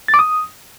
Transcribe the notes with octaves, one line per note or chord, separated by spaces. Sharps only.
A6
D6
D#6